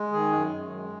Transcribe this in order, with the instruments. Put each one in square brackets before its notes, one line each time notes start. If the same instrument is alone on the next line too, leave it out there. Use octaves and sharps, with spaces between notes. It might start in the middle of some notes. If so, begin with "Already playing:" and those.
Already playing: [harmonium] G#3
D#3 G#4
F#2
F#2
G#3